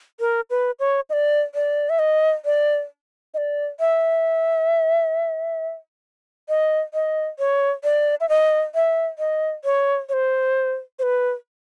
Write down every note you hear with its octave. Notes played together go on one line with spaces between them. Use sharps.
A#4
B4
C#5
D#5
D5
D5
E5
D#5
D5
D#5
D5
E5
D#5
D#5
C#5
D5
E5
D#5
E5
D#5
C#5
C#5
C5
C5
B4